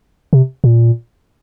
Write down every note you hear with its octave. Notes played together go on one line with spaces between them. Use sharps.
C3
A#2